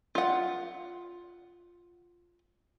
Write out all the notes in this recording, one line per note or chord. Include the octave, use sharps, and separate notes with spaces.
F4 F#5